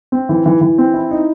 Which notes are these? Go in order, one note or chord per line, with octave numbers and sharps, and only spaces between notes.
C4
E3
E3
E3
C4
E4
D#4